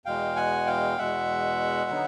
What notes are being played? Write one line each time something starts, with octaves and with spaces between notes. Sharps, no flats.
E2 B2 G#3 F5 G5
F#5 G#5
F5 G5
E2 B2 G#3 E5 F#5
D3 F#3 B3 D#4